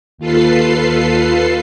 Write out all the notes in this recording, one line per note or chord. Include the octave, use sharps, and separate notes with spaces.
D#2 F4 A4 B4 C7